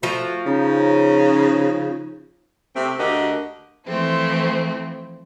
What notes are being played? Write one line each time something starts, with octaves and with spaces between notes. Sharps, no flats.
F3 A3 F#4
C#3 C#4 D#4
C3 A3 C4
D2 D3 F#4 G4 A#4 D#5
E3 F3 A3 C4 E4